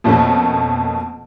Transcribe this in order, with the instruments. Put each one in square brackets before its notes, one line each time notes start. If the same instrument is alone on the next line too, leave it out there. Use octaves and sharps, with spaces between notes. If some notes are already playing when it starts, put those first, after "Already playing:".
[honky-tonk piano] F2 B2 A3 A#3 C#4